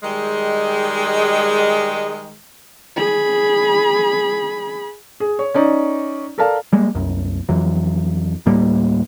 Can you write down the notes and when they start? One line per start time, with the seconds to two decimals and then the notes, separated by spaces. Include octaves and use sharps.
0.03 D#3 G3 G#3
2.97 G#4 B5
5.20 G#4
5.39 C#5
5.54 C#4 D#4 D5
6.38 A4 A#4 D5 F5 A5
6.73 G3 G#3 A#3
6.95 C2 F#2
7.49 F2 E3 F#3
8.46 D1 A2 G3 A#3